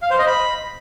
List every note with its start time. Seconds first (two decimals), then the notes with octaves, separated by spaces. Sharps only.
0.02 F5
0.10 C5
0.19 D#5
0.27 B5